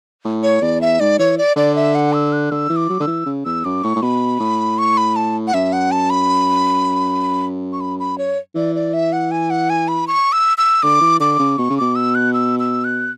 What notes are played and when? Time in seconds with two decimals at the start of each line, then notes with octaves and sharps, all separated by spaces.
0.25 A2
0.43 C#5
0.62 E2 D5
0.81 E5
1.00 G#2 D5
1.19 E3 C#5
1.38 D5
1.56 D3 D5
1.76 E5
1.95 F#5
2.13 E6
2.32 F#6
2.51 D3 E6
2.70 E3
2.76 D6
2.90 F#3
3.00 D3 E6
3.07 E3
3.26 C#3
3.45 E2 E6
3.65 F#2 D6
3.84 A2 C#6
3.96 A2
4.02 B2 B5
4.40 A2
4.78 C#6
4.97 B5
5.16 A5
5.47 F#5
5.54 F#2 E5
5.73 F#5
5.92 A5
6.10 B5
7.73 C#6
7.81 B5
8.00 B5
8.18 C#5
8.55 E3 D5
8.75 D5
8.93 E5
9.13 F#5
9.31 G#5
9.50 F#5
9.70 G#5
9.88 B5
10.07 C#6
10.32 E6
10.58 E6
10.83 D3 D6
11.01 E3
11.20 D3 D6
11.39 C#3
11.58 B2 C#6
11.70 C#3
11.78 B2 D6
11.96 E6
12.15 F#6
12.33 E6
12.59 E6
12.84 F#6